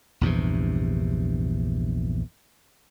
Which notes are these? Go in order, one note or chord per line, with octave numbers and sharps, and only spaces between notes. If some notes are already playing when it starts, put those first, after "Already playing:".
A#1 E2 G2 C3